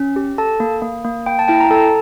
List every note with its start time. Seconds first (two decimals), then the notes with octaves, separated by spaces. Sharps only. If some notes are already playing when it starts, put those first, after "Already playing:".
Already playing: C#4
0.16 G4
0.38 A4 A5
0.60 A#3
0.82 A#3
1.05 A#3
1.26 A#3 G5
1.39 A5
1.48 E4 G5
1.61 A#5
1.71 A4 A5